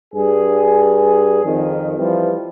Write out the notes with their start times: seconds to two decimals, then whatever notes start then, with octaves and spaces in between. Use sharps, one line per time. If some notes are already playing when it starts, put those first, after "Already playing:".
0.15 G2 G#4
1.44 F2 D#3
1.97 E3 F3 G3